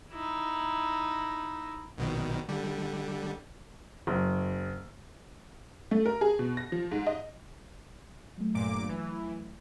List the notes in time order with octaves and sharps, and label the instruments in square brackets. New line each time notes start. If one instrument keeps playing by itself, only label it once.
[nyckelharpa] D#4 E4
[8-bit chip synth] A#1 B2 D#3
D3 G3
[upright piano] F#1
[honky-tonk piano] A3
A#4
G#4
B2
A#6
F3
G#2
D#5
[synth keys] F#3 A3
[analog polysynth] G1 A#2 D6
E3